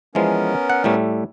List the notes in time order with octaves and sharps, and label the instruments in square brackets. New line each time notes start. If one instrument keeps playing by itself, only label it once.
[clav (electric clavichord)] E3 F3 G#3 [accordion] B3 C#4 A#4
[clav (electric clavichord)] F#5
A2 G3 A3